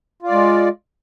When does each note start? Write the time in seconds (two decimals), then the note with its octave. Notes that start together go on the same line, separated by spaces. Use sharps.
0.22 F4
0.27 D5
0.31 G#3